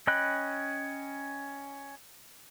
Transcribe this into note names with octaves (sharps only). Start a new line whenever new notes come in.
C#4 D#5 G5 B5 F#6